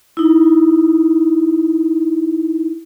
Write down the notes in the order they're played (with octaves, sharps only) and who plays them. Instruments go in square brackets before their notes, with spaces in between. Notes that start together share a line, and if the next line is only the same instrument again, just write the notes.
[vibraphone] D#4 E4